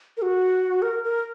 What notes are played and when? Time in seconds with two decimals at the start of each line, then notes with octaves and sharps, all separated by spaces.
0.17 A#4
0.22 F#4
0.82 A#4
1.04 A#4